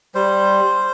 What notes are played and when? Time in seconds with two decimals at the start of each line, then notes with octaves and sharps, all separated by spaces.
0.15 G3 C5